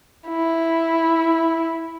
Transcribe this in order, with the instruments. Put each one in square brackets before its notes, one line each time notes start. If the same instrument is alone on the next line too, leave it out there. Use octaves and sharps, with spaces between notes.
[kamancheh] E4